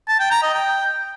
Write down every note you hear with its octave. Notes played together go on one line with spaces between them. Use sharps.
A5
G5
A#5
D#5
G5